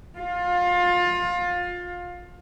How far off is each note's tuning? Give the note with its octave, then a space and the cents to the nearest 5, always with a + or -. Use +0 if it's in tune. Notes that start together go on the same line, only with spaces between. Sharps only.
F4 +25